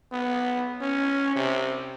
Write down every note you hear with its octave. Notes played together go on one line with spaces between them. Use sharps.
B3
C#4
C3